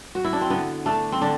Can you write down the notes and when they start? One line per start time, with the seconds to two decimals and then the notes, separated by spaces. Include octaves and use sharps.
0.15 F#4
0.24 E4
0.33 D4
0.41 C4
0.50 D3 B3
0.86 A3 D4
1.12 C4
1.21 D3 D4